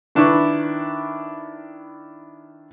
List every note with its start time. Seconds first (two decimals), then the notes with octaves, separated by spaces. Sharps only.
0.15 D#3 D4 E4 B4 C#6